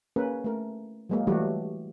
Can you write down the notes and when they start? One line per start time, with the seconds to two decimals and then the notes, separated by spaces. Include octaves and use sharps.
0.16 A#3 C#4 G#4 A#4 B4
0.44 A3 A#4
1.10 F#3 G#3 A#3
1.27 E3 F#3 G3 A3 F#4 G4